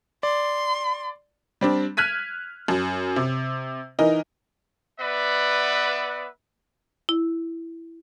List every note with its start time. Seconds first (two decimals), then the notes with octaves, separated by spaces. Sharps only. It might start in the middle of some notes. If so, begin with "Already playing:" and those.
0.23 D5 C6
1.61 G3 C4 D4
1.97 F6 F#6 G#6 B6 D#7
2.68 F#2
3.16 C3
3.99 E3 D#4 A#4
5.00 B3 B4 D5 E5 F#5
7.09 E4